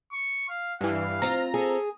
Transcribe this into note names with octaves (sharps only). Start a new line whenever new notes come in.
C#6
F5
G2 E3 F5
C4 F4 A#5
G#4 A4